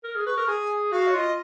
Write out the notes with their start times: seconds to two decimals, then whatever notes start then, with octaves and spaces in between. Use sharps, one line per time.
0.04 A#4
0.15 G#4
0.26 B4 C#6
0.37 A#4
0.48 G#4 G#5
0.91 F#4 F5
1.07 C#5
1.14 F4 D#5